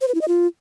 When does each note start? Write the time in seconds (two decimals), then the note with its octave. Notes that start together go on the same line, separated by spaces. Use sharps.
0.01 C5
0.08 B4
0.15 E4
0.21 D#5
0.28 F4